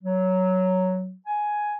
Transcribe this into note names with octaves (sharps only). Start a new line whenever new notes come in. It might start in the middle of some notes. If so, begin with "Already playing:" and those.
F#3
G#5